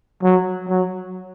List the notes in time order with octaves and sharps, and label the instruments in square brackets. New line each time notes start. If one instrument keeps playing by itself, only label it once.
[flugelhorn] F#3
F#3